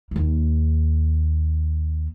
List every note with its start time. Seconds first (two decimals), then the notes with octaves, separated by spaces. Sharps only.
0.11 D#2 A#3